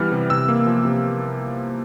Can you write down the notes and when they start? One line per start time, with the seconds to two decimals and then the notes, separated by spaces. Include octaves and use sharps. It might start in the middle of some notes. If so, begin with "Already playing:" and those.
Already playing: E3 G3 B3 F6
0.12 C3
0.30 C3 E6
0.49 A#3
0.67 F3
0.85 C3